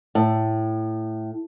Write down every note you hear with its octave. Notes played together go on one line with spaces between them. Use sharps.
A2